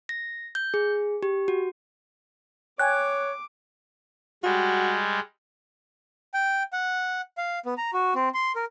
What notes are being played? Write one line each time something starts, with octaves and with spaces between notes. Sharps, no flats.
A#6
G6
G#4
G4
F#4
C#5 G5 G#5 D6 F#6 G#6
G3 G#3 F#4
G5
F#5
F5
B3
A#5
F#4
C4
C6
A#4